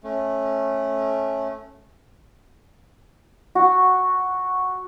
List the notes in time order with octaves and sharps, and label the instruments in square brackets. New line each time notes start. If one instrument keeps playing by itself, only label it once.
[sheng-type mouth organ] A3 C#4
[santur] F#4